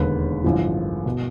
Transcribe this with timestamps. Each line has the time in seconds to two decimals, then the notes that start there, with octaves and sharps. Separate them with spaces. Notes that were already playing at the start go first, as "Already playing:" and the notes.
Already playing: E1 D#2 D3 B4
0.44 A1 G2 D3 F3
1.06 B2